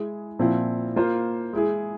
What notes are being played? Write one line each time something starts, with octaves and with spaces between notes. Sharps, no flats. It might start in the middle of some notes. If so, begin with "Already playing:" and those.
Already playing: G#3 E4 G#4
A#2 F3 C4 E4
A#3 F4 C5
G#3 E4 G#4